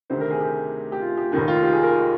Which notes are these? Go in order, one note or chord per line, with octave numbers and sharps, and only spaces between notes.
D2 C3 D#3 C5
A#4
G#4
G4
G4
F4
G4
F1 D#2 D#3 G4
F4
G4
G#4
A#4